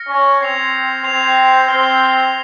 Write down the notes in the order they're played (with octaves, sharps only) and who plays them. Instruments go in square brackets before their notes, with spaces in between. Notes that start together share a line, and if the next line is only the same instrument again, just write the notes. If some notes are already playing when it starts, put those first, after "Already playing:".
Already playing: [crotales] F6 A#6 C#7
[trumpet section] C#4
[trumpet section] C4 [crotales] G#6 C7 F7
[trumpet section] C4 [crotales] G#6 C7 F7
[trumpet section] C4 [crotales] F6 C7 G7